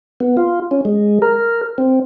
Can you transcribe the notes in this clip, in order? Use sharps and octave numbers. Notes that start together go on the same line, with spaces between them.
B3
F4
C#4
G#3
A#4
C4